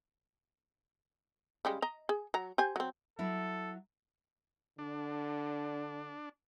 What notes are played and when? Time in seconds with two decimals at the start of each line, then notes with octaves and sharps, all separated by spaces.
1.65 C#3 G3 G#3
1.82 D#5 A#5
2.09 G#4
2.34 F#3 A#5
2.58 G4 C5 G#5
2.76 F#3 C4
3.19 F#3 E4 A4
4.79 D3 D4